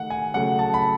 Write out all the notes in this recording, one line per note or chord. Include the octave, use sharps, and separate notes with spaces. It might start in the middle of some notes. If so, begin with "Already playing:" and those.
Already playing: D#3 A3 F#5
G#5
C#3 F#3 A3 F#5
A5
B5